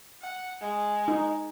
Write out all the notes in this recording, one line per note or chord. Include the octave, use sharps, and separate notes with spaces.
F#5
G#3
D#4